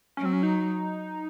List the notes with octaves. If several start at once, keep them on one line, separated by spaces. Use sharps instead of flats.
F#3 C#4
C4
C#4
D#4